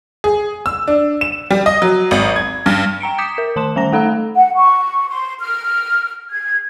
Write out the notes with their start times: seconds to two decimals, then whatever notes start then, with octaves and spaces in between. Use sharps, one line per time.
0.24 G#4
0.66 E6
0.88 D4
1.21 E7
1.51 G3
1.66 D#5
1.82 F#3
2.11 G#1
2.36 G#6
2.66 G2
3.00 G5 A#5 C#7 D7
3.18 D6 D#6 G6 B6 C#7 E7
3.38 A#4
3.56 D#3 A5 C6 E7
3.76 D#3 G3 G#5 A#5 A#6
3.93 A3 A4 F5 A#5 E6
4.36 F#5
4.57 C#6
5.08 C6
5.39 F6
6.30 G#6